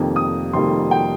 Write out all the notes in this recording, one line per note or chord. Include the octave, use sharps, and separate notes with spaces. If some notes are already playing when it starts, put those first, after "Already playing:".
Already playing: F1 F2 D#3 G3 A#3
D#6
F1 F2 D#3 G3 A#3 C6
G5